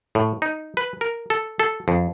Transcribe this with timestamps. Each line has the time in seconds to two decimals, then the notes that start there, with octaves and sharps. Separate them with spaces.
0.15 A2
0.42 D#4
0.77 B4
1.01 A#4
1.30 A4
1.59 A4
1.88 F2